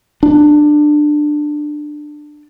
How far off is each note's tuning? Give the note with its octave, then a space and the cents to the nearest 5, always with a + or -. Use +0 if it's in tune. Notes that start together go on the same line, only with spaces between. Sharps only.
D4 +20